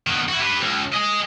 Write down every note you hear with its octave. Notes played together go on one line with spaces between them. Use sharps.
D#3 B3
E4 F#4
G4 B4
C#2
D#5 G#5